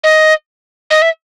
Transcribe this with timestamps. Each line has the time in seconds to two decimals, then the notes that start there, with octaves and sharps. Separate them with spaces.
0.04 D#5
0.90 D#5
1.02 E5